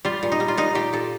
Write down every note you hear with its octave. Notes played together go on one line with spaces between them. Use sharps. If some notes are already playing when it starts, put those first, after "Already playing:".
G3 F4
A#2
D#4
G3
F4
A#2 D#4
A#2 G4
A#2 A4